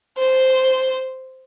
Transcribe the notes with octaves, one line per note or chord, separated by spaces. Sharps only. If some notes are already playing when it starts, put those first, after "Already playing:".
C5